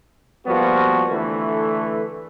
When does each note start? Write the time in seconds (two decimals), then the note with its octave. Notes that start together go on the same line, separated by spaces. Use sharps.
0.47 F3 G3 A#3 B3 F#4
1.12 D3 E3 A3